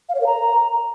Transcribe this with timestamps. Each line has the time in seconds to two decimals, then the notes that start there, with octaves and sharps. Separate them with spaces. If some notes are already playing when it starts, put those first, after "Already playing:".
0.09 F5
0.15 C#5
0.21 A#4
0.26 A#5